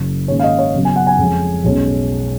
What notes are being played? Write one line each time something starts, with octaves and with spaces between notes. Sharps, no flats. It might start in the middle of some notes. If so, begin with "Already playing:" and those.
Already playing: F#1 F#2 C#3
G#2 D#3 A#3 C#4 C#5
F5
D#5
C#5
F#1 F#2 C#3 F#3 B3
G#5
F#5
G#5
F2 C#3 G#3 C#4
B1 B2 G#3 C#4